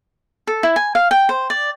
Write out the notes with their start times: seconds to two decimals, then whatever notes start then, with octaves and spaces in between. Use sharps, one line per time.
0.47 A4
0.63 E4
0.76 G#5
0.95 F5
1.11 G5
1.29 C5
1.50 D5